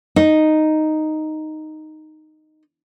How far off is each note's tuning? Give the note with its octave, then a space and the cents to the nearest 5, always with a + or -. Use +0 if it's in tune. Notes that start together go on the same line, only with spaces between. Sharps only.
D#4 -5